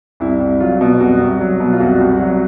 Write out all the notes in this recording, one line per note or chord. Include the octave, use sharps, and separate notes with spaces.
C2 E4
C2
F#3 F4
B2
C2 F#4
C2
F#3
B2
F4
C2 F#4
C2
F#3